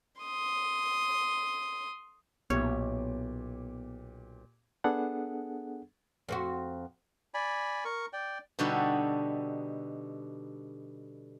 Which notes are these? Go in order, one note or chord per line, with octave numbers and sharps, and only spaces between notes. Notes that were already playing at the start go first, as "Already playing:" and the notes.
C6 D#6
B1 A#2 B3 G4 C#5
B3 D4 G#4 A4 F#5
F2 C4 F#4
D5 G#5 B5
A#4 C#6
D5 G5
B2 D3 G3 D#4 F#4 A4